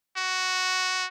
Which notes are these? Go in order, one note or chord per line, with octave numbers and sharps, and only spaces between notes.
F#4